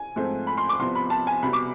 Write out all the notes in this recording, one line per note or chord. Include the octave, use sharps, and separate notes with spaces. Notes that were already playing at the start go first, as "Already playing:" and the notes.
Already playing: G#5
G#2 F3 A3 C4
B5
C6
D6
C2 C3 F3 B3 C6
B5
A5
G#5
C2 B2 B3 B5
D6